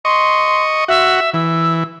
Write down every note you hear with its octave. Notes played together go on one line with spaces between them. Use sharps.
D#5 C6 C#6
F#4 E5
E3 E6